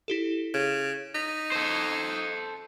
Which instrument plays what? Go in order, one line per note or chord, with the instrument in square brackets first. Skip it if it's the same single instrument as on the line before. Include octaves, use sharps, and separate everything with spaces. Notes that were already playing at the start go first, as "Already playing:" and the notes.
[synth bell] E4 G4 A4
[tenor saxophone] C#3 [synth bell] E7
[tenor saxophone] D#4 [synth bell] B6
[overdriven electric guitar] A4 C5